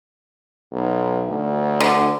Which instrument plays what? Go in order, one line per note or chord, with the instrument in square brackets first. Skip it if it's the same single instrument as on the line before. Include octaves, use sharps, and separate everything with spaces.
[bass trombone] B1
D2
[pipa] D3